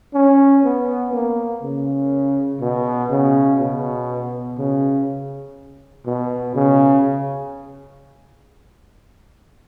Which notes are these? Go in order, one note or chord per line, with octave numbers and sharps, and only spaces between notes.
C#4
B3
A#3
C#3
B2
C#3
B2
C#3
B2
C#3